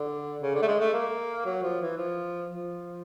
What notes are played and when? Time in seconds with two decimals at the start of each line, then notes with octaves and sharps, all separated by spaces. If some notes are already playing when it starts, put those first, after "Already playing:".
Already playing: D3
0.42 C#3
0.55 D3
0.62 A3
0.68 G#3
0.80 A3
0.93 A#3
1.46 F#3
1.63 F3
1.81 E3
1.98 F3
2.50 F3